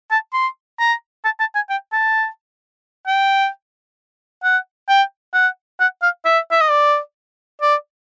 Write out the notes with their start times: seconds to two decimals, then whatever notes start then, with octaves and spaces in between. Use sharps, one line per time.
0.11 A5
0.33 C6
0.79 A#5
1.25 A5
1.40 A5
1.55 G#5
1.70 G5
1.93 A5
3.07 G5
4.43 F#5
4.89 G5
5.34 F#5
5.80 F#5
6.02 F5
6.25 E5
6.51 E5
6.61 D#5
6.70 D5
7.61 D5